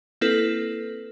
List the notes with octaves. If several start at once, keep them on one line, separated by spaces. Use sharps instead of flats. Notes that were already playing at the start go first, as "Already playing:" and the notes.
A#3 C4 E4 A4 B4